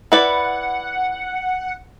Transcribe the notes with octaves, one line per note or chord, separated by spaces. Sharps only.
E4 B4 D5 F#5